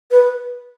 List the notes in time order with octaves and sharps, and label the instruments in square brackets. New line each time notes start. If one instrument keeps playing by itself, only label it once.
[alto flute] B4